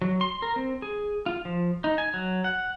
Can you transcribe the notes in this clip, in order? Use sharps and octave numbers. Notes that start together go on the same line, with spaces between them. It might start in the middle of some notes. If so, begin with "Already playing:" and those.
F#3
C6
A#4
C4
G#4
F4
F3
D#4
G#5
F#3
F#5